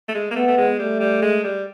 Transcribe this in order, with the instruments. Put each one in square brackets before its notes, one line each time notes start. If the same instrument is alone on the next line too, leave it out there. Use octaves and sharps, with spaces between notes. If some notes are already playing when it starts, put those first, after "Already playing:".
[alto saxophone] A3
G#3
A#3
[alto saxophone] A3 [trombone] B3
[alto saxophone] A3
G#3
[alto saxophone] G3 [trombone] A3
[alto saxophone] G3
G#3
G3